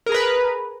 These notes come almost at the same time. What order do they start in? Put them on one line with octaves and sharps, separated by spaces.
A#4 G#4 A#5 B4